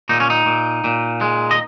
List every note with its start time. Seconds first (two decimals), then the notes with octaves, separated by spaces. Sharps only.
0.09 A#2 D#4
0.20 C#4
0.30 D#4
0.46 A#2
0.84 A#2
1.21 G#3
1.51 D#5